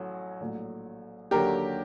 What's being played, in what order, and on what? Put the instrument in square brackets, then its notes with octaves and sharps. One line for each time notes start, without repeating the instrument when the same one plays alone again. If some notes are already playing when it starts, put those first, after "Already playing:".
Already playing: [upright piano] A1 A2 F#3
A#1 A2 F#3
D#2 D3 F#3 G4 A#4